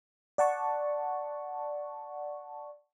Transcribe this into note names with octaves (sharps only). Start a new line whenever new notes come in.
D5 F#5 A5 C#6